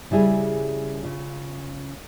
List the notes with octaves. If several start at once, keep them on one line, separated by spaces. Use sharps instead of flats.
C#3 G3 E4 G#4
C#3 F4